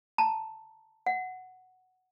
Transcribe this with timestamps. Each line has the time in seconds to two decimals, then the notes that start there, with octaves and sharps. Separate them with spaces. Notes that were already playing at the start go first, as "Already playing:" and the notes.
0.18 A5 A#5
1.06 F#5